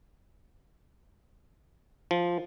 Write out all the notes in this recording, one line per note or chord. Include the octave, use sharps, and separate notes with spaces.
F3